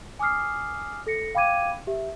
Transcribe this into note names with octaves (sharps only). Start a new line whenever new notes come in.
G#5 D6 D#6 F6 C7
A4 A#6 C#7
F5 G5 B5 D6 G#6 D#7
G4 E5